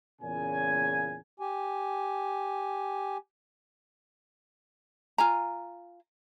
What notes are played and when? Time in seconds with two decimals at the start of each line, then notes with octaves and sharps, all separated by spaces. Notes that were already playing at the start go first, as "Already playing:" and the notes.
0.21 E2 A#2 C#3 G#5
1.40 G4 G#5
5.18 F4 G#5 A#5